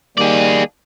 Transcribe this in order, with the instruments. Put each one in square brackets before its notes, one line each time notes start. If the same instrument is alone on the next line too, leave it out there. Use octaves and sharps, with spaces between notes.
[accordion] D#3 G3 A#3 [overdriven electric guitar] G#4 D5